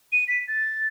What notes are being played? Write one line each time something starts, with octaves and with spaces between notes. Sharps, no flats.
D#7
B6
A6